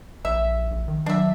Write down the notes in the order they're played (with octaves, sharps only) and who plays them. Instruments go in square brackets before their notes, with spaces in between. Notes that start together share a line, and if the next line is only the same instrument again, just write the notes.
[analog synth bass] A#1 [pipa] E5
[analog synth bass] A#1
D#3
[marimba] F#3 [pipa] D4 E5